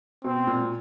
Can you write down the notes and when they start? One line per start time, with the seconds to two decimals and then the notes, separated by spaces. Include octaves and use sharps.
0.24 B2 C4
0.47 A#2